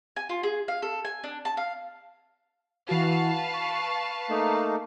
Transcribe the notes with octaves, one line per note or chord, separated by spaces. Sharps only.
G#5
F4
G#4
F5
A4
G#5
D4
A5
F5
E3 F#4 B4 F5 A5
C#6
A3 A#3 D#4